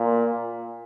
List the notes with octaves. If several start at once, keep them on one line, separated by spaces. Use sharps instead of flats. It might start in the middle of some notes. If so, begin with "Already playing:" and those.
Already playing: A#2